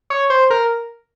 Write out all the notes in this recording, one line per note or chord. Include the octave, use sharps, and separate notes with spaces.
C#5
C5
A#4